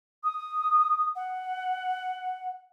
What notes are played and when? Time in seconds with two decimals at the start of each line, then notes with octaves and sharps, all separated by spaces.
0.24 D#6
1.16 F#5